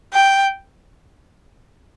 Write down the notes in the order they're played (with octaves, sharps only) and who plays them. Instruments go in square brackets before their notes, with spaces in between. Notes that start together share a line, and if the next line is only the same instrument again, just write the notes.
[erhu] G5